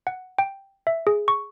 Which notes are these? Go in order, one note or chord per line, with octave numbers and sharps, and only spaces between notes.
F#5
G5
E5
G#4
C#6